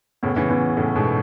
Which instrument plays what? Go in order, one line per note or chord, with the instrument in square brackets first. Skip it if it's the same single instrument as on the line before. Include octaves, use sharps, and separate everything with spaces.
[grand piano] A2 C#3 [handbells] B3
[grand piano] C#3 E3
[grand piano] C#3 E3 [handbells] B3
[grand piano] A2 C#3 [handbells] A4
[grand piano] G#2 B2
[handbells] B3